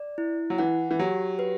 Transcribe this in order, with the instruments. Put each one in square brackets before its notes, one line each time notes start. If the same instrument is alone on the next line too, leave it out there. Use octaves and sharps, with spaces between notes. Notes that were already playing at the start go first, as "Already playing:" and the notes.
Already playing: [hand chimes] D5
E4
[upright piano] F#3
[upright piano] E3 [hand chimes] F#5
[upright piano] E3
[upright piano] F#3 [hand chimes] G4
[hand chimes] B4